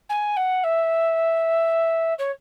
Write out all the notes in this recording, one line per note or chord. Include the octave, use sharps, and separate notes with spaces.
G#5
F#5
E5
C#5